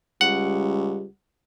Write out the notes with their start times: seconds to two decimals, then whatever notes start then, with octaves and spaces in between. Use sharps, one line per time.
0.21 C#2 G3 F#5